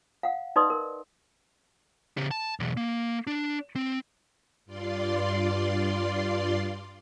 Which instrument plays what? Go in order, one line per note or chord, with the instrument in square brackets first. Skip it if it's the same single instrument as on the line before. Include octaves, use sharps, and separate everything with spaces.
[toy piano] F5 F#5
D#4 B4 D5 D#5 C6 D#6
A#4
[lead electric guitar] C#3 G4
A5
B1 E2
A#3
D4
C4
[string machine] G2 F4 D5 C6